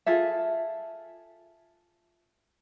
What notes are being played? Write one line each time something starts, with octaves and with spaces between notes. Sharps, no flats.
F4 G#4 A4 E5